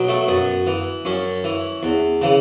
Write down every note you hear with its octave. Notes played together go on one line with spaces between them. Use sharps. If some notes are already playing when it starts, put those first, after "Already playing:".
Already playing: B2 F#3
A3
F#2 B3
E3
F#2 C#4
E3
E2
C#3 E3